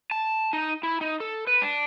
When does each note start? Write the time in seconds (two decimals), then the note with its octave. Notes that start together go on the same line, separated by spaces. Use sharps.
0.11 A5
0.53 D#4
0.83 E4
1.01 D#4
1.20 A4
1.47 B4
1.62 D4